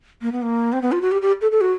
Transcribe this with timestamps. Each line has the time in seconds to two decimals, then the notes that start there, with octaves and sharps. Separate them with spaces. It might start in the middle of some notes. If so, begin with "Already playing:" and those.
0.22 A#3
0.32 B3
0.42 A#3
0.73 C4
0.82 B3
0.92 F4
1.02 F#4
1.12 G4
1.22 G4
1.41 A4
1.52 A4
1.61 F#4